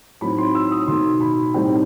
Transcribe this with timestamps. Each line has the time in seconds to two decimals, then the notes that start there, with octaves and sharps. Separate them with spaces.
0.21 A2 F#3 C4 D#4 B5
0.38 C6
0.55 E6
0.71 D#6
0.88 B2 A3 D#4 C6
1.21 B5
1.54 A2 G3 C4 D#4 G5